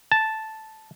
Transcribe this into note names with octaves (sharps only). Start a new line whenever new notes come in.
A5